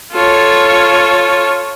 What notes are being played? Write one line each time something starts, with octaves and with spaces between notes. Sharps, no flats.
F4 A4 C#5